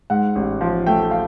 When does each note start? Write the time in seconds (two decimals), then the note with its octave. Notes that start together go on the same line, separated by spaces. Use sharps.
0.10 G#2 F#5
0.36 A1
0.61 F3
0.87 A3 G5
1.11 F5